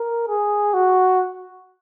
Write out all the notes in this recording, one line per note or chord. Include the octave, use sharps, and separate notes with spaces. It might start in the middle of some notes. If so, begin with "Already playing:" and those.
Already playing: A#4
G#4
F#4